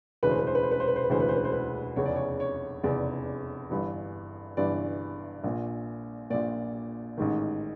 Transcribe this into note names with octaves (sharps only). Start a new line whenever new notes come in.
E1 D2 C#3 E3 B4
C5
B4
C5
B4
C5
B4
C5
B4
C5
B4
E1 D2 C#3 E3 C5
B4
C5
B4
C5
B4
F1 E2 C#3 C#5
D5
C#5
C#5
F1 E2 C#3 D5
G1 G2 E3
G1 G2 E3 D5
A#1 A#2
A#1 A#2 D5
A1 G#2 D#3